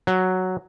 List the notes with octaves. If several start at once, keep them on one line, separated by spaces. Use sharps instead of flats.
F#3